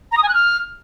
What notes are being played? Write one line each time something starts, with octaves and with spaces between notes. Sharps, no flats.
A#5
D#6
G#5
F#6
F6